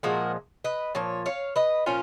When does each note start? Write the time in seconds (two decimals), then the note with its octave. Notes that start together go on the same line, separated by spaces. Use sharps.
0.03 A#2 F3 G#3 F#4 A#4
0.64 B4 D#5
0.95 A#2 F3 C#5
1.26 C#5 F5
1.56 B4 D#5
1.86 A#2 F3 C#4 F4